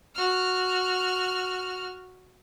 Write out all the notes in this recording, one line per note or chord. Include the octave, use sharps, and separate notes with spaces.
F#4 F6